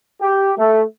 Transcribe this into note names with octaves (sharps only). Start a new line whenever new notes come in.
G4
A3